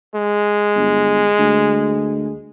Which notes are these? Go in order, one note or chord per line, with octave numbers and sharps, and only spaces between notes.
G#3
G1
D2